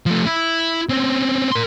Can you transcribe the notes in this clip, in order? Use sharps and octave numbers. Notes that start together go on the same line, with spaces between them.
F3 A3
E4
C4 C#4
A#4 C6